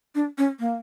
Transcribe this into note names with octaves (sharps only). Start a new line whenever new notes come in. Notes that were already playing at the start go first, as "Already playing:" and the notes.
D4
C#4
A#3